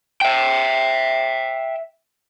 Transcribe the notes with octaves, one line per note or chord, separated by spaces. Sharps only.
E5 G5